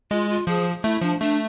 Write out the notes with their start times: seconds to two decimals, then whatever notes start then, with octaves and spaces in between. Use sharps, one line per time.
0.11 G#3 F4
0.30 F4
0.47 F3 G#4
0.83 A3 E4
1.01 F3 D4
1.20 A3 D4